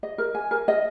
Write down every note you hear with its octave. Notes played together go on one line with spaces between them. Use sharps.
D#5
A#4
G#5
A#4
D#5